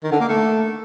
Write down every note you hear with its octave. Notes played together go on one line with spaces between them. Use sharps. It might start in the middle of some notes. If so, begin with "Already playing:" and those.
D#3
D3
A#3
A3